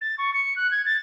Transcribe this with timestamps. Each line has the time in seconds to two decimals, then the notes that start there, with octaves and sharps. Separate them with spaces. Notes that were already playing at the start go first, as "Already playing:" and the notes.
0.01 A6
0.18 C#6
0.34 C#7
0.56 F#6
0.71 G#6
0.86 A6